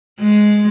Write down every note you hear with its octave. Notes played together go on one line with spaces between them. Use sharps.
G#3